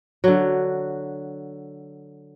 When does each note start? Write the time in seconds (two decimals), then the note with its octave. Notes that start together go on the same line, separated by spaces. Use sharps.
0.24 D3 F#3